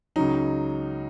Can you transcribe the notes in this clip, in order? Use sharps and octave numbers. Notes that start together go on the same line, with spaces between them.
C#2 C#3 F#3 D#4